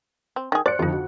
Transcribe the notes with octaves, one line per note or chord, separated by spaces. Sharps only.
C4
D#3 G#4
C5 D5 F#6 C#7
F2 D3 D#4 F4
F#4